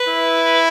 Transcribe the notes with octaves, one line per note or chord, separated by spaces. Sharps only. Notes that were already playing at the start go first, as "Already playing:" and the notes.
Already playing: B4
E4